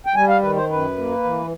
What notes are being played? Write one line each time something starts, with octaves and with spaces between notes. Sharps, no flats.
G5
G3 G#5
F5
D#3 B4
C5
F#2 B4
A#3
E3